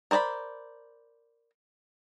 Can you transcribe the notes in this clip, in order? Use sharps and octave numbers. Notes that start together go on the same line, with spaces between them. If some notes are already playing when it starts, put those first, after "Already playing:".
A#4 C5 D5 A5 B5